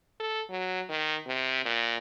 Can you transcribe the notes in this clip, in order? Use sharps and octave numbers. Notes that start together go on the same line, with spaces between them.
A4
F#3
D#3
C3
A#2